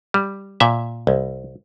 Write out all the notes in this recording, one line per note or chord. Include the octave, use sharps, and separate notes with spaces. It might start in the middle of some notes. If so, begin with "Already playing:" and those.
G3
A#2 E5
C2